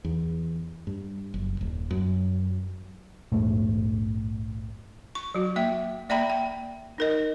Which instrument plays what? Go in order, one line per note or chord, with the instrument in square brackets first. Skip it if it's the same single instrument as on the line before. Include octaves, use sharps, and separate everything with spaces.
[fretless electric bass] E2
G2
F#1
D#1
F#2
[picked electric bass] A#1 E2 G#2 A3
[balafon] C#6
F#3 F#4
A#3 E5 G5
A#3 D5 E5 G5 A#5 B5
G5
D#4 A#4 D#5